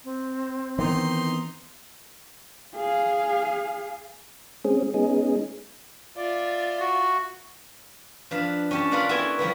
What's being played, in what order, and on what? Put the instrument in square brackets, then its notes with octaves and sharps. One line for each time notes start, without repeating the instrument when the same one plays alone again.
[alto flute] C4
[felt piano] D#3 [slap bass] E3 B3 [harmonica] D#4 C6
[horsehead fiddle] G#4 F5
[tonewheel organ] G#3 C4 C#4 G#4
G#3 B3 C#4 D#4 G#4
[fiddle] F4 E5 [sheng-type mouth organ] D5
[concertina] F#4
[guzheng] F3 D4 B4 F5
C#4 G4 A5
F4 A#4 B4 D5 F5 F#5
B3 E4 F#4 A4 G5 G#5
F3 G3 A#3 B3